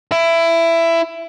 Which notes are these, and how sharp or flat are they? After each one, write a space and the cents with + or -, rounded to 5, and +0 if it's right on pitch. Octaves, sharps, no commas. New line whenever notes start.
E4 +15